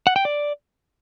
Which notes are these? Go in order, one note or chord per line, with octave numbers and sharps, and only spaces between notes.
F#5
G5
D5